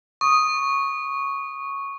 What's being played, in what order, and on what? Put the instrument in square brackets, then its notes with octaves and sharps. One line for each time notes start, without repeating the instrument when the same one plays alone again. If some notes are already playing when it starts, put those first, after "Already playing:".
[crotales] C#6 [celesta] D#6